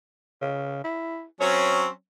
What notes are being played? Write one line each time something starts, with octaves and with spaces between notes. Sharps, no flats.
C#3
E4
F#3 C4 C#4 C#5